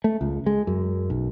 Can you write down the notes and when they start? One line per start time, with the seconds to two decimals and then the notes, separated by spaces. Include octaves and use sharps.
0.04 A3
0.21 C#2
0.46 G#3
0.67 F#2
1.10 B1